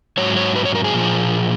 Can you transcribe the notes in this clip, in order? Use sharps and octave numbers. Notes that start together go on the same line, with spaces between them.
G#2 F#3 C#5
C#5
B4
C#5
A#4
G#4
A#2 F3